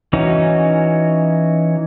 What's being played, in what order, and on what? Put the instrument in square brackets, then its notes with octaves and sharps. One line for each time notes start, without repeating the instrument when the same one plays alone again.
[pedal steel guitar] E3 C#4 D#4 F#4